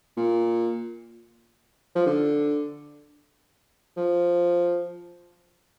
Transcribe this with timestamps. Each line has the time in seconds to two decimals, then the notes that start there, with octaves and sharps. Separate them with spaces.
0.17 A#2
1.95 F3
2.06 D3
3.97 F3